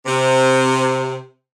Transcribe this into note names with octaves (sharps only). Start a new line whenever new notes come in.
C3